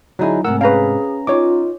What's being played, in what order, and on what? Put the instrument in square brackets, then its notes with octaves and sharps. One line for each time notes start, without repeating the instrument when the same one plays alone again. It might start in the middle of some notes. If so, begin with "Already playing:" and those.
[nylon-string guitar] D3 G#4 [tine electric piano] F#3 D#4 E4
[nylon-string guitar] G#2 C3 A3 [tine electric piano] A#4 F#5 E6
[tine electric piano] C#4 A#5 [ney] G#4 [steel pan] B4 F5
[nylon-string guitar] D#4 [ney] F4 [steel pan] C#5 D6